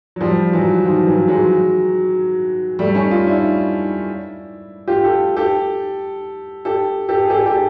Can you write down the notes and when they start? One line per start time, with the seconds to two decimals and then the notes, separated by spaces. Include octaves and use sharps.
0.16 F#3
0.21 F3 G3
0.53 E3 F#3
0.85 D#3 F3
1.07 E3 F#3
1.28 F#3 G#3
2.79 G3 A3
2.95 C#4 D#4
3.11 D#4 F4
3.27 D4 E4
4.87 F4 G4
5.04 G4 A4
5.36 G4 A4
6.65 G4 A4
7.09 G4 A4
7.25 G#4
7.30 G4 A4
7.46 G4 A4